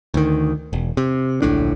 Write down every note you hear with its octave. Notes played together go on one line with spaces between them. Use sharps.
D2 D#3
E1
C3
D1 A#1 A2 D4